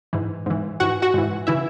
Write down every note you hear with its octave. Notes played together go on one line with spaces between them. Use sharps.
G#2 E3
G#2 E3
G#2 E3 F#4 F#5
F#4 F#5
G#2 E3
C#3 E3 E4 E5